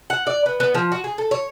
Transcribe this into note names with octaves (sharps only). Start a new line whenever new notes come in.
F#5
D5
B3
B3
F3
F#4
G#4
A4
C#5